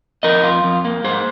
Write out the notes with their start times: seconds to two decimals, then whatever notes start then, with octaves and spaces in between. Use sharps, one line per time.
0.23 F2 A#4 D#5
0.43 F4
0.64 F2
0.85 A#3
1.04 G#2 G#4 C5